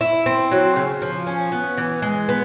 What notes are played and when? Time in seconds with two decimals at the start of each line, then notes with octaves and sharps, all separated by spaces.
0.01 E4
0.26 C4
0.51 F#3
0.76 C#3
1.02 F3
1.27 C#4
1.52 B3
1.78 E3
2.02 G#3
2.29 B3